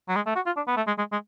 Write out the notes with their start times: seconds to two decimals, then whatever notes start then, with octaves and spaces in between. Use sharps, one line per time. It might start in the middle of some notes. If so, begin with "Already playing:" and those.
0.08 F#3
0.16 G#3
0.26 A3
0.35 F#4
0.46 F4
0.57 D4
0.67 B3
0.77 A3
0.87 G#3
0.98 G#3
1.12 G#3